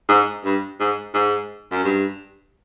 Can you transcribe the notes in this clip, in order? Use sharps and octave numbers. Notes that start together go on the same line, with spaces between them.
G#2
G2
G#2
G#2
F#2
G2